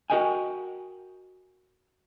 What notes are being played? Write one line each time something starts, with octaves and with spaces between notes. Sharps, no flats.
F#4 G4 A#4 D#5 G5 G#5